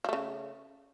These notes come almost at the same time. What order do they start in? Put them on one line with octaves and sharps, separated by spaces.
F3 A3 C#3